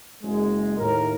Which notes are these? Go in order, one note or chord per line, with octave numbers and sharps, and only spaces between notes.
F#1 G#3
D#2 A2 A#4